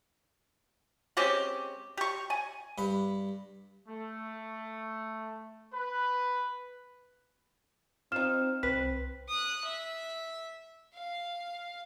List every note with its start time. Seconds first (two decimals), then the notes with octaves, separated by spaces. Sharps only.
1.17 G#3 C4 C#4 G4
1.97 G4 C#6
2.30 G#5
2.78 G2 B5
3.89 A3
5.73 B4
8.12 C4 D#4 F4 F6 E7
8.63 C2 C4 B4 B6
9.29 D#6 F#6
9.65 E5
10.94 F5